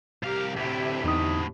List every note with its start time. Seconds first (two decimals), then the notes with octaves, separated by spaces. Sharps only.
0.23 C2 G4 A#4 F5
0.56 D2 A2 C3 G4 E5
1.04 E2 D#4 D#6